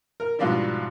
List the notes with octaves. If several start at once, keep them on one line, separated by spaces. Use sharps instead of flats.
A#4
G#2 B2 F3 G3 D4 E4